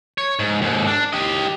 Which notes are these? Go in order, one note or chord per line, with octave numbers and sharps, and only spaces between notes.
C#5
G#2
D#2 G#2
D4
G4 D#5